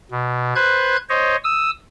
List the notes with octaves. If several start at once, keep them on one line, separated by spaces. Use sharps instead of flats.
B2
B4 C5 F#6 G#6
C5 C#5 D#5
D#6 E6